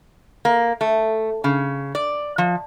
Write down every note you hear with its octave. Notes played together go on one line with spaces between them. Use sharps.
A#3
A3
C#3
D5
F3